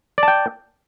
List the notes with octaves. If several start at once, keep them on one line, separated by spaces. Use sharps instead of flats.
D5 G5 A5